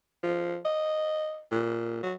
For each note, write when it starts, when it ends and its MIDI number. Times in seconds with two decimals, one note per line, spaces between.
0.23 0.57 53
0.65 1.41 75
1.52 2.00 46
2.03 2.14 54